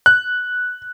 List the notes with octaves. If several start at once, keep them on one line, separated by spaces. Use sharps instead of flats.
F#6